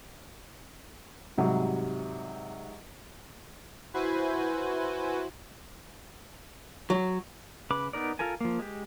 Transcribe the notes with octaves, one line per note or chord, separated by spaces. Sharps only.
G#2 C3 F#3 G3
E4 F#4 B4 C5 G#5
F#3
C#3 B4 B5 D6
B3 D#4 A#4 D5
F4 A4 A#4 G#5
F3 A#3
G#3 G4